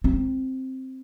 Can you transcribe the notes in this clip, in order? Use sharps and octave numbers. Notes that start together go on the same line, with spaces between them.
C4